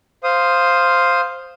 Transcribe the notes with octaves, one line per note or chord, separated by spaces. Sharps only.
C5 F5 D#6